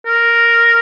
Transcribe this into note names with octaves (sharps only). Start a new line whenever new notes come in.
A#4